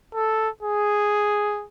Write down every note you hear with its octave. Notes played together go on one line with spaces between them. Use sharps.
A4
G#4